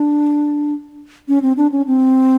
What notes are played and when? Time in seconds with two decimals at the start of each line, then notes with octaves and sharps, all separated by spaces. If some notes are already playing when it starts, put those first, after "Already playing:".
Already playing: D4
1.28 C#4
1.42 C4
1.57 D4
1.72 C#4
1.87 C4